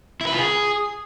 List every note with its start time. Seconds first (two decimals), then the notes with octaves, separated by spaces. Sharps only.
0.21 E4
0.27 B4
0.33 F4
0.38 G#4